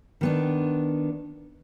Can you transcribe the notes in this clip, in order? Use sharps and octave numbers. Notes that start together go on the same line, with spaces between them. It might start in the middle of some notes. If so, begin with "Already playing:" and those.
D#3 B3 D4